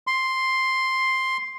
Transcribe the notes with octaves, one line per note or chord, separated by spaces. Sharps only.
C6